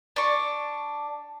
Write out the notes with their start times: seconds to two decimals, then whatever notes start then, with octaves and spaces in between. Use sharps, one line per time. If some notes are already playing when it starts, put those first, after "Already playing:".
0.16 D4 C#6